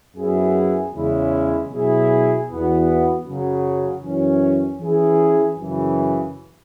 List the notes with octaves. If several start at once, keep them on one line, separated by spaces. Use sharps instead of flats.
F#2 F#3 B3 E4 G#4
E2 C#3 G#3 C#4 E4
B2 F#3 E4 G#4
E2 E3 B3 F#4
F#2 C#3 F#3
F#2 E3 C#4
E3 C#4 E4 G#4
F#2 C#3 E3